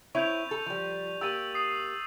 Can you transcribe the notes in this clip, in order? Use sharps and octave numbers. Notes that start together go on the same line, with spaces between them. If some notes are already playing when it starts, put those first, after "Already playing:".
C4 E4 C#5 C#6 G6 F7
A4
F3 G3
A#3 G4 E6 A6 D#7
D#6 C7